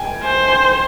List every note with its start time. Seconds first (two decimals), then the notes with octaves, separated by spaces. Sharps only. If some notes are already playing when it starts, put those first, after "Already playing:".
Already playing: G5 G#5
0.24 C5 G#5
0.48 G#5